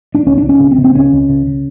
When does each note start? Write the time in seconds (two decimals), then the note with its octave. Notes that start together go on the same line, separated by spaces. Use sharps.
0.15 D4
0.26 C#2 C#4
0.38 D4
0.43 C#2
0.49 C#4
0.60 C#3
0.71 C4
0.78 C#3
0.84 C4
0.95 C#2 C#4
1.13 C#2
1.29 C#3
1.47 C#3